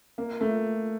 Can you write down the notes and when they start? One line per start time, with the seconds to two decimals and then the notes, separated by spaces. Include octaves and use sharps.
0.18 A#3
0.41 A3